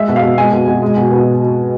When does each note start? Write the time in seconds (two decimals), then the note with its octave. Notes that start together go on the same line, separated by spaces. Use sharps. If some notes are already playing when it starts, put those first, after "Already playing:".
Already playing: G#3 E5
0.08 B2
0.16 F5
0.22 B2
0.38 G#3 G#5
0.52 B2
0.67 B2
0.82 G#3
0.97 B2
1.11 B2